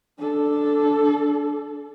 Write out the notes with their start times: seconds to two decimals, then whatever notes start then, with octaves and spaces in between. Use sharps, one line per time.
0.18 D4 A4